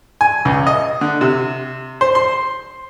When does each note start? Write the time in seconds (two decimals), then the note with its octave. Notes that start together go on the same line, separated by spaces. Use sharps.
0.21 G#5
0.45 C#2
0.67 D#5
1.01 D3
1.21 C3
2.01 C5
2.15 C6